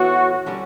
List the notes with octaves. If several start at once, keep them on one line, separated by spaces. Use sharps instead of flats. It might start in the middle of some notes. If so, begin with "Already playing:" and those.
Already playing: A2 E3 B3 F#4
D3 G3 C#4